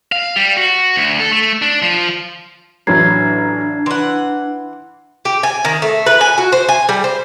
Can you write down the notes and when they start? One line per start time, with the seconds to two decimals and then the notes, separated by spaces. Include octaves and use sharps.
0.12 F5
0.36 G3
0.57 F#4
0.96 D2
1.20 A4
1.31 A3
1.62 D4
1.82 F3
2.87 A1 F#3 D4 A#5 G#6 C7
3.86 E3 F#5 C6
5.25 G4
5.43 G#5
5.65 D#3
5.82 A3
6.06 B4
6.21 G#5
6.38 F#4
6.52 C5
6.69 G#5
6.89 G3
7.04 C5